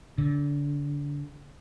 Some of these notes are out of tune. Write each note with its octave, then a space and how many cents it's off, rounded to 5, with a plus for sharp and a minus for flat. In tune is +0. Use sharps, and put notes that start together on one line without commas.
D3 -30